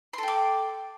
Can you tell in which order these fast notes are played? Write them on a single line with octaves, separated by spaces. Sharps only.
C6 A4 G5 D6